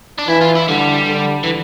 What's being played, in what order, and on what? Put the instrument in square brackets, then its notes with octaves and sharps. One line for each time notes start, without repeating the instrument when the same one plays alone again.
[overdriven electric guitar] D4
[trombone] E3 [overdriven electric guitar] E4
[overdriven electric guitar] F4
E4
[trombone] D3 [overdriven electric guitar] G3
[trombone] D3
[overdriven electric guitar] E3